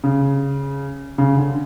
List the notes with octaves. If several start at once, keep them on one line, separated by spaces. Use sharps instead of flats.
C#3
C#3
D3